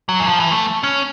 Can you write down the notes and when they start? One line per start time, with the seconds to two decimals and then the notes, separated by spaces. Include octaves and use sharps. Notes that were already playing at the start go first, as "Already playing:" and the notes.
0.09 F#3
0.20 E3
0.27 F3
0.40 E3
0.52 A3
0.84 C#4